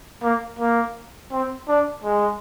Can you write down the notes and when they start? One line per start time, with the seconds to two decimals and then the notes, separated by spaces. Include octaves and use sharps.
0.23 A#3
0.59 A#3
1.32 C4
1.68 D4
2.04 G#3